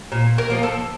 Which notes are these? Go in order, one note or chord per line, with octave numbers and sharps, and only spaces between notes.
A#2
A#4
F3 A#3
A4